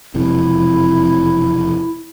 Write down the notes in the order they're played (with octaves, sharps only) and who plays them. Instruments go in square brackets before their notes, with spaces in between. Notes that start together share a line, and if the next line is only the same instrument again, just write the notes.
[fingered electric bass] E1 F2 C3 [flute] E4